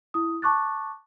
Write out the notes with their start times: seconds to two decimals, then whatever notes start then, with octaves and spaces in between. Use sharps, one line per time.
0.14 E4 D#6
0.42 A5 C#6 D6 F#6 A6